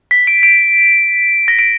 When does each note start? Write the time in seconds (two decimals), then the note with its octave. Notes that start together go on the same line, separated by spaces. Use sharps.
0.11 B6
0.27 D7
0.43 D7
1.48 A#6
1.59 D7